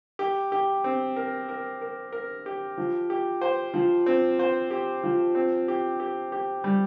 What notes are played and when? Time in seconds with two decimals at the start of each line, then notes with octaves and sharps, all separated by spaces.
0.19 G4
0.52 G4
0.84 C4
1.16 A#4
1.49 A#4
1.81 A#4
2.13 A#4
2.46 G4
2.78 F3
3.10 G4
3.41 C5
3.74 F3
4.06 C4
4.39 C5
4.71 G4
5.04 F3
5.35 C4
5.68 G4
6.00 G4
6.32 G4
6.64 G3